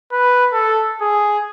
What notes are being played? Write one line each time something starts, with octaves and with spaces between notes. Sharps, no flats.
B4
A4
G#4